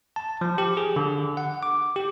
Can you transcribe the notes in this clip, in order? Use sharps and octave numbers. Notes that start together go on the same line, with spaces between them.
A5
F3
G4
G#4
D3
F#5
D6
G4